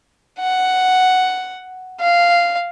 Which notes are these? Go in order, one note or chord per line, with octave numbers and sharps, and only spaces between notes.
F#5
F5